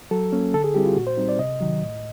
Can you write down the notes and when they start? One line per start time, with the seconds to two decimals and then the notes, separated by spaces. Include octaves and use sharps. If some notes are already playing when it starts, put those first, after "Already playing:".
0.11 F#3 A4
0.32 A#3 C#4
0.54 D3 A4
0.64 G#4
0.74 G3 C4 E4 G4
0.86 F4
0.96 A#2 F#4
1.07 C5
1.17 G3 C4 D#4
1.29 D5
1.38 C3 D#5
1.60 D#3 F#3
1.82 A2